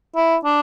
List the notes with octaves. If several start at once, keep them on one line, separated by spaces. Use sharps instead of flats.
E4
D4